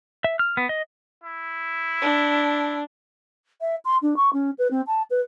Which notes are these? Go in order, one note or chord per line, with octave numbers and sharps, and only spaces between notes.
E5
F6
B3
D#5
E4
D4
E5
C6
D4
C#6
C#4
B4
C4
A5
B4